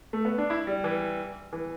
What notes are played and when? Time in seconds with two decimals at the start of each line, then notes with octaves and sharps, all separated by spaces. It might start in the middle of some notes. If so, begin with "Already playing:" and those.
0.13 A3
0.25 B3
0.38 D4
0.50 E4
0.67 G3
0.84 E3
1.53 E3